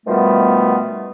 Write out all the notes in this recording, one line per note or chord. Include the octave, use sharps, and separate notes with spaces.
B2 D#3 F3 G3 A3 B3